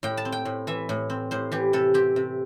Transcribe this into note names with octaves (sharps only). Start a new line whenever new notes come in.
A2 G5
A5
C4
G5
A2
E3 E5
A2
C4
A2 C5
E3 G4
C3 A4
C4 G4
C3